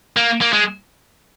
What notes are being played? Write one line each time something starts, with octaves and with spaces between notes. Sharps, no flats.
A#3
A#3
G#3